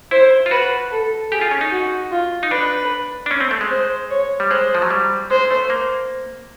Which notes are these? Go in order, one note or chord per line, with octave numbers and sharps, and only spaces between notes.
E4 C5
F4
F#4 B4
A4
G4 G#4
F4
C#4
D#4
F#4
F4
D#4
D4 B4
D4
C#4
C4
A3
G#3
C5
C#5
G3
G#3 C5
F3
F#3
G3
G#3 C5
A3
A#3